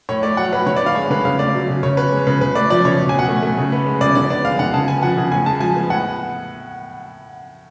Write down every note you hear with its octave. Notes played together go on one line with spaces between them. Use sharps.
A2 C#5
A3 D5
F#3 F#5
A2 B4
D3 C#5
D5
B3
F5
G#3 C#5
D3 B4
C#3 F5
A3 D5
F#3
C#3
C#3 C#5
B3 B4
G#3
C#3 B4
C#3 B4
A3 D5
F3 D5
C#3 C#5
B2
G#5
B2 F#5
A3
A3
C#3
B3
G#3
C#3 D5
D3 D5
B3 D5
G#3 F5
D3 F#5
C#3 A5
B3 G#5
F3 F#5
C#3
A2 G#5
G#3 A5
F3 G#5
B3
A2 F#5